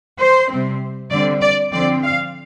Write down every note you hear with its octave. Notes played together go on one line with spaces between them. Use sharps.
C5
C3 G3 C4
D3 G3 C4 D5
D5
D3 F3 C4 D5
F5